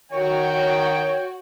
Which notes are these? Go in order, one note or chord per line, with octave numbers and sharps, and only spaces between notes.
D#3 F#4 C#5 G5